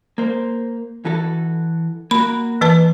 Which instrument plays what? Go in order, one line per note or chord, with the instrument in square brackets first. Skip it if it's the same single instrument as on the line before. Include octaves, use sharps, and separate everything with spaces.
[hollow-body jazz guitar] A#3 C5
E3 F#4 A4
[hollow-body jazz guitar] A#3 F#4 [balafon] B5
[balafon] E3 B4 A5